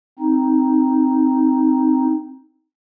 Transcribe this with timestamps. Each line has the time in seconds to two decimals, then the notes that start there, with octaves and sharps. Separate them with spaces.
0.19 C4 D#4